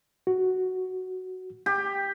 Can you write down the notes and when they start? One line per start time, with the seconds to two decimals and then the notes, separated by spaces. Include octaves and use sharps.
0.27 F#4
1.66 G4